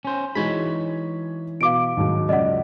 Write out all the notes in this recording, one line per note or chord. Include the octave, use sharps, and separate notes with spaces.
C#4 C5
E3 G#3 D#4 F#4 C#5 B5
B2 F5 D6 D7
D#2 G#2 F#3
C#2 F#2 D5 D#5 F#5